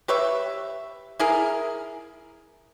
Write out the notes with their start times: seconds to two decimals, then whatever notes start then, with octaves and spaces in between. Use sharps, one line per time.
0.08 G4 B4 C#5 E5
1.19 E4 G#4 A#4